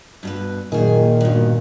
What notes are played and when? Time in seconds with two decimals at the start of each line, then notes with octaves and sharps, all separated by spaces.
0.23 G2 B2 B4
0.72 F#2 A#2 D#3 G#4
1.21 G2 B2